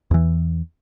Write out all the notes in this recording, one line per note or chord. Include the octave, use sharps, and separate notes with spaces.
E2 E3